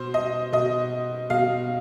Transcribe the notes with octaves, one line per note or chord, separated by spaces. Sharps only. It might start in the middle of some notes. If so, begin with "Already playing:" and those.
Already playing: B2 C5
D#5
B2 D#5
B2 F5